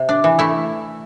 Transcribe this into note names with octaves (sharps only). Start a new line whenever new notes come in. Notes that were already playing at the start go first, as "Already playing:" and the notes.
Already playing: C3
D4
E3
A3 E4